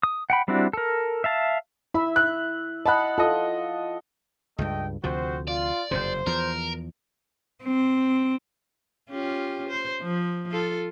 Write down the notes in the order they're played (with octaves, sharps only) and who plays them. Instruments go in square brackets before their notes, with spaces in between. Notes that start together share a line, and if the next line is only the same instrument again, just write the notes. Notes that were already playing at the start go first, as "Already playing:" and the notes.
[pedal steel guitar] D#6
F#5 G5 B5
G3 C4 D4 E4 F#4
A4 A#4
E5 F5 A5
[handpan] E4 E5 [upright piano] B5
[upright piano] F#6
[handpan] D#5 F#5 [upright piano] A5 B5 F#6
[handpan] F4 [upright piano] A4 D#5
[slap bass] C#2 G2 [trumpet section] A3 D#5 G5
[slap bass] D2 C3 F3 [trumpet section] C4 F#4 C5
[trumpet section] F4 [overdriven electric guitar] D5
[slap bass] F#1 F2 C3 [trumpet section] C5
[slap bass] E2 F3 [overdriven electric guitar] A#4
[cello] C4
[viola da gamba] C#4 F4 G4
C5
F3
F4 A4